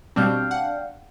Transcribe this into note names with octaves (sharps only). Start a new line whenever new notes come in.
B2 G3 C4 D4 F5 G5
F#5